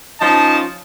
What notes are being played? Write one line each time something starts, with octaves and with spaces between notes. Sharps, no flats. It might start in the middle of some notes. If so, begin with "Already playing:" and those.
F3 C#4 D#4 D#5 A5